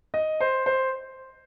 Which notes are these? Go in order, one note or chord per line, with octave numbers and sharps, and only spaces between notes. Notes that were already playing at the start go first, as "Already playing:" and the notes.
D#5
C5
C5